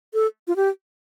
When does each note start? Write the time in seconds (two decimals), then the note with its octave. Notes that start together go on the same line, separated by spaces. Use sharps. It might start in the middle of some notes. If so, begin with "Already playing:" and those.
0.14 A4
0.48 F4
0.56 G4